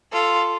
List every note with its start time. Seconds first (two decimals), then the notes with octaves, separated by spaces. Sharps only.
0.13 F4 A4